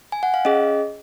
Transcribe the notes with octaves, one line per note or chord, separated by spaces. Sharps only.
G#5
F#5
F5
C#4 G#4 D#5